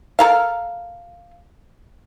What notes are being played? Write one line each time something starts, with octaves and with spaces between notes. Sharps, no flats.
A4 A#4 F5